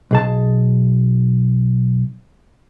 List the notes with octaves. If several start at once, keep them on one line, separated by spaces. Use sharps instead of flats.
B1 G#4 A5